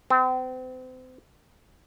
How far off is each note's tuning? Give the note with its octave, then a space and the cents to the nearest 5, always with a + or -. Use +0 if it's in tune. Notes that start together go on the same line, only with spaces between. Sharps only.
C4 -35